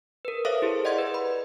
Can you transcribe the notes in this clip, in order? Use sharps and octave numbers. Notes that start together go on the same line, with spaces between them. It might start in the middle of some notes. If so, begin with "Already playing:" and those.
A#4 B4
A4 C5 C#5 E5 F5 D#6
E4 G4 G#4
D5 D#5 F#5 C6 G#6
B4
B5